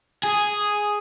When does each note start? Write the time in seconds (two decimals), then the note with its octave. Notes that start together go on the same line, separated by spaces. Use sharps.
0.23 G#4